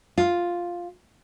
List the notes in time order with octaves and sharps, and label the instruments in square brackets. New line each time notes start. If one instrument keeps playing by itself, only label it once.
[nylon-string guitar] F4